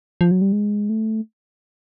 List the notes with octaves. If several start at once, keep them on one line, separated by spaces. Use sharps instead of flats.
F3
F#3
G3
G#3
A3